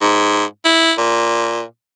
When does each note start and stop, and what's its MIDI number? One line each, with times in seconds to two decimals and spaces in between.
0.01 0.45 44
0.65 0.93 64
0.98 1.63 46